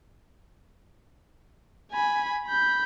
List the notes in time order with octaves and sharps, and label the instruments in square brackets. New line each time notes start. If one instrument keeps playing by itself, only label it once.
[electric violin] G#5 B5
B5 G6